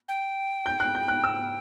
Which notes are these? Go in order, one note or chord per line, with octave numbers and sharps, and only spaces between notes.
G5
G6
F#6
G6
F#6
E6